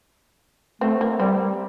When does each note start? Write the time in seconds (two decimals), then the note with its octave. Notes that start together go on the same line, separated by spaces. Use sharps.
0.81 A3 C4
1.01 A#3
1.20 G3 C4